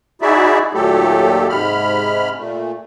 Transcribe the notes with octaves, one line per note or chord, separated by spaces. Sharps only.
D#4 E4 F#4 G#4 D5 E5
D#2 A#2 F#3 A3 G4 A4
G#2 C3 G#3 B5 F6
A#2 A3